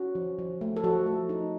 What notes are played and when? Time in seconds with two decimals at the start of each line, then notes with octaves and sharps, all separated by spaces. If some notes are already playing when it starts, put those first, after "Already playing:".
Already playing: C#4 F#4
0.15 F3
0.39 F3
0.61 A3
0.77 A4
0.84 F3 F#4
1.06 A3
1.29 D#4